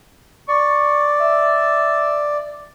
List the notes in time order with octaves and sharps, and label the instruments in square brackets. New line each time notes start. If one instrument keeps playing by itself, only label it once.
[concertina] D5 [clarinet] C#6
[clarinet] E5